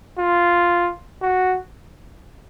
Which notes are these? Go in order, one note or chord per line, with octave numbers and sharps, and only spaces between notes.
F4
F#4